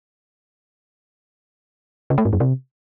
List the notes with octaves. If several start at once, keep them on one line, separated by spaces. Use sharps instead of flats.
C#3
A3
G#2
F#2
C3